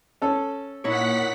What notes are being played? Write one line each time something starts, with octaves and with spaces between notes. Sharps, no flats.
C#4 A4
A#2 D#4 E4 C#5 F#5 B6